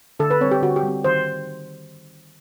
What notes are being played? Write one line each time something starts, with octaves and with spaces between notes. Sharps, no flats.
D3 A4
B4
G3 C4 C#5
G4
D3 F#4
G4
G3 C4
D#3 C5